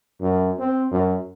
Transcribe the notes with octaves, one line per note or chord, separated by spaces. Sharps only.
F#2
C4
F#2